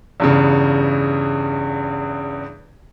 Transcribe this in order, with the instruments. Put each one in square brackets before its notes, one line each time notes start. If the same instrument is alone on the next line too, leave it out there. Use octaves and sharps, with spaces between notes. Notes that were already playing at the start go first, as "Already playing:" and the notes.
[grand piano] E2 G2 C#3